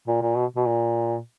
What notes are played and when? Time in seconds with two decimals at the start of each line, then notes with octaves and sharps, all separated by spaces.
0.08 A#2
0.22 A#2
0.37 B2
0.56 B2
0.66 A#2